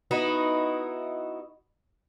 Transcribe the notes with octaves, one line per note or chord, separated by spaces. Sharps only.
B3 D#4 E4 F#4